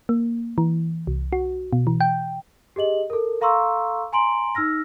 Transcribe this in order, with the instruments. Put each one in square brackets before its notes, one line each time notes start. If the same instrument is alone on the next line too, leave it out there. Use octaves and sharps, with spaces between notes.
[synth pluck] A#3
E3
C2
F#4
B2
E3
G5
[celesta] G4 G#4 D#5 F#7
A4 A#4
A4 F5 A#5 C6 C#6 E6
G#5 A#5 C6 D7 F#7
D#4 E6 F6 A#6